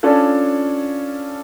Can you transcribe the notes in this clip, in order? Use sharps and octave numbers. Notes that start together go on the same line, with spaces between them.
C#4 D4 F4 A4